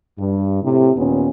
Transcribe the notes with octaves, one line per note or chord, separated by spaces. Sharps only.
G2
A2 C3
D#2 A#2 B3 C#4